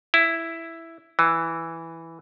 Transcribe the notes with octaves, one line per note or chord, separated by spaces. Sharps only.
E4
E3